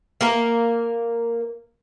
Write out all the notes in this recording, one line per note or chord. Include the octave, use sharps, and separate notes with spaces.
A#3 A#4